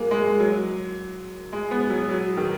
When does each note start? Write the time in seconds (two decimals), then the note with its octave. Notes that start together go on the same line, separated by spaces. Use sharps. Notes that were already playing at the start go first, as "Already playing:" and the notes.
Already playing: F#3 G#3 A#3
0.11 G#3
0.40 F#3
1.53 G#3
1.71 B3
1.90 F#3
2.09 F#3
2.37 D#3